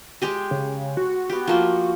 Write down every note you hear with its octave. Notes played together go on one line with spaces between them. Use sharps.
G#3 G4 G#4
C#3
F#4
B3 G4
F3 A#3 C5